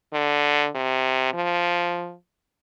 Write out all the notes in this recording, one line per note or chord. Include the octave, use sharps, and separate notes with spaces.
D3
C3
F3